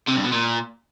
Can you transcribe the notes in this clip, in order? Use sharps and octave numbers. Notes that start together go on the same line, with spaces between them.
C3
G2
B2
A#2